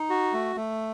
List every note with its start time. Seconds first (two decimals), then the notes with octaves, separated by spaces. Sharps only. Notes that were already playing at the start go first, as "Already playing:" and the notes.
Already playing: D#4
0.10 F#4
0.33 A3
0.56 A3